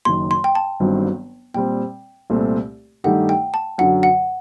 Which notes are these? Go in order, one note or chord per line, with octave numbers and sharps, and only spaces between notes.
F#1 F#2 D#3 C6
C6
G5
A5
G1 G2 D#3 F#3 C4
A#2 G3 C4 G5
C2 A#2 A3 C4
G2 D#3 A3 D#4 G4 F#5
G5
A5
F#2 D3 F#3 F#5
F#5